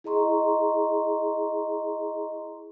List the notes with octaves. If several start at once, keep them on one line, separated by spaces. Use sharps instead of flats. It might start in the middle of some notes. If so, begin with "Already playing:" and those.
E4 G#4 D#5 A#5 C6 C#6